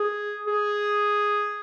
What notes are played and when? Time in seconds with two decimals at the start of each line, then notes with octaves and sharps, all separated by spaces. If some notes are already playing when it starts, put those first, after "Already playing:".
Already playing: G#4
0.47 G#4